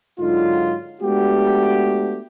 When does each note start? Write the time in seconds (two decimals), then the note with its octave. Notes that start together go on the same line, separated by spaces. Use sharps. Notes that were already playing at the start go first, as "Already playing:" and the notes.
0.19 G#2 D3 F#3 D#4 F4
1.01 G#3 A3 B3 D4 F#4 G4